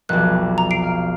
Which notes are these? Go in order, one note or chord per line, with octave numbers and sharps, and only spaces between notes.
F1 B1 F#6
A#5
C7 D7
F5